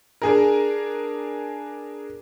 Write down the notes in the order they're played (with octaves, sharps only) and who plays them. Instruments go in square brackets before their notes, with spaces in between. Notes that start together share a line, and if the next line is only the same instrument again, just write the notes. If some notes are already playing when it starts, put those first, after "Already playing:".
[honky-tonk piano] D4 G#4 A#4